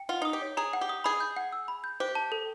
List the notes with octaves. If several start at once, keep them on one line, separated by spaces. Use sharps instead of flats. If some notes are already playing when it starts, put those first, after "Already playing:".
Already playing: G5
F4 F#5
D#4 D#6
G4
C#5
G#4 A#5
F#5
G4
D#6
G#4 B5
G6
F#5
E6
B5
G6
G4 C5
A5
A4